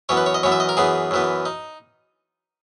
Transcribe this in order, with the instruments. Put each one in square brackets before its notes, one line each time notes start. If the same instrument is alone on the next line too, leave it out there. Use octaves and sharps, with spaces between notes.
[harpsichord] F#2 E3 B3 C#5
B4
C#5
D#5
F#2 E3 B3 C#5
E5
D#5
A#4
F#2 E3 B3 G#4
F#2 E3 B3
D#4